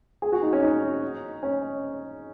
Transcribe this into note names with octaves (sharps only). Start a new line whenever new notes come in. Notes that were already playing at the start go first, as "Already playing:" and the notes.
G#4
F#4
D#4
C#4
D#4
C#4